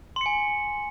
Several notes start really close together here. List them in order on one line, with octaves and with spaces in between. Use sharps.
C6 C#7 G#5